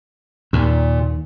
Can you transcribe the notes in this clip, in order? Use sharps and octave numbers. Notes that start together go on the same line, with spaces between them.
D#2 A#2